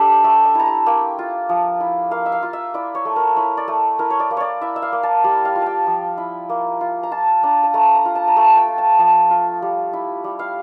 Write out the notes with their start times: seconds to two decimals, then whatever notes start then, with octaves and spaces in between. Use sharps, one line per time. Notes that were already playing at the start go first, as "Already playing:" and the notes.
Already playing: D4 G4 A4
0.24 A3 E5
0.45 E5
0.55 E4 A#5
0.66 A5
0.86 A#3 G5
1.19 F4
1.49 F3
1.80 E4
2.11 A#3 F5
2.26 E5
2.32 F5
2.42 F4
2.53 E5
2.74 E4 D5
2.95 C#5
3.05 A3
3.16 A#4
3.36 E4 C#5
3.57 D5
3.68 A3
3.99 E4 A#4
4.10 C#5
4.20 D5
4.31 A#3
4.37 C#5 D5
4.61 E4 E5
4.76 E5
4.82 F5
4.93 A#3
5.03 A5
5.24 G3 G5
5.45 F5
5.56 F4
5.62 G5 A5
5.87 F3
6.18 E4
6.49 A#3
6.81 F4
7.03 A#5
7.11 F4 A5
7.43 D4 A#5
7.63 A5
7.74 A3 A#5
7.95 A#5
8.05 F4
8.15 A5
8.27 A#5
8.36 A3 A5
8.57 G5
8.68 F4
8.78 A5
8.99 F3 A5
9.30 F4
9.62 G3
9.93 E4
10.24 G3
10.39 F5